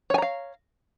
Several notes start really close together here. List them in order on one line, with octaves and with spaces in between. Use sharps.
C#5 G#5 A#5 F5